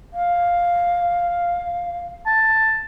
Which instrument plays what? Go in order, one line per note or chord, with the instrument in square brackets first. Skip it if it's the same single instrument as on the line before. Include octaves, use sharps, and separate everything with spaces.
[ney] F5
[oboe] A5